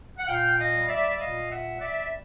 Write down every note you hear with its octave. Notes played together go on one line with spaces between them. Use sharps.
F#5
A#2 F5 G5
D#5 F5
G3
D5 E5
E5
A#2 D#5 F5
E5 F#5
G3
D5 E5